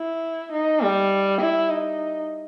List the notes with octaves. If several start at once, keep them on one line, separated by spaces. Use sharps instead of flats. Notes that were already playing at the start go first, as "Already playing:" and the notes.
Already playing: E4
D#4
G3
E4
D#4